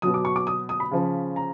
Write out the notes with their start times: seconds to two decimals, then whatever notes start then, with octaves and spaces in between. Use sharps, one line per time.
0.02 B2 F#3 D#6
0.14 D6
0.25 C#6
0.36 D6
0.47 D#6
0.69 D#6
0.80 B5
0.92 C#3 F3
1.36 A#5